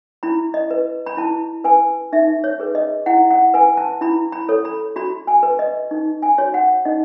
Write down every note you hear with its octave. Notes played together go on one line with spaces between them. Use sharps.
E4 B5
D#5
B4
B5
E4 A5
B4 G#5
D#4 E5
C#5
G#4 B4
D#5
E4 F#5
F#5
B4 G#5
A5
E4 B5
B5
A4 C#5
B5
F#4 B5
G#5
B4
D#5
D#4
G#5
F#4 C#5
F#5
D#4 D#5